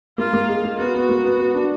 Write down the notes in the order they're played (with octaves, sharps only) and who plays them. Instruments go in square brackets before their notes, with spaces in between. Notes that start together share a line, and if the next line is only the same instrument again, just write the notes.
[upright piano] A#3 [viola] F4
[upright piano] A#3
G#3
A#3
[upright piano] B3 [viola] F#4
[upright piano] B3
A#3
B3
B3
D4